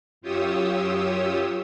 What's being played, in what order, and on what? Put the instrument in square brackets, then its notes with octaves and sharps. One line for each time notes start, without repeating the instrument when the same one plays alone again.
[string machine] F#2 F4 G4 C#5 D#6 E6